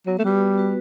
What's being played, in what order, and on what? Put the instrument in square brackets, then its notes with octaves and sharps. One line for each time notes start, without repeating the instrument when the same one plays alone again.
[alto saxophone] F#3 [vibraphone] B3
[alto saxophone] A3
[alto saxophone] G3 [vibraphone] F#4 B4
[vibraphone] B3
F#4 B4